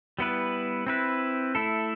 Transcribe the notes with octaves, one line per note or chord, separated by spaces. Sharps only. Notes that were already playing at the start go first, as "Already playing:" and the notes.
G3 B3 E4 B4
C4 E4 B4
A3 E4 A4